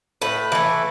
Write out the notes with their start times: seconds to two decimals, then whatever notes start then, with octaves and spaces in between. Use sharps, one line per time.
0.22 A2 B4
0.52 E3 A3